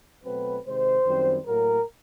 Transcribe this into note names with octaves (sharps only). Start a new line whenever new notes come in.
B2 F#3 A3 C4 B4
C3 D#3 G#3 C5
F#2 D#3 G3 C4
A2 F#3 A#3 A#4